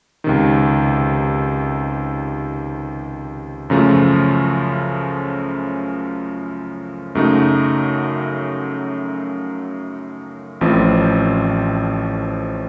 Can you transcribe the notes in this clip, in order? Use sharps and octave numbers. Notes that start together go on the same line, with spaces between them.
C#2 C3 D#3
F#2 C#3 F3 A3
F#2 C#3 F#3 A3 D#4
A1 A2 F3 C4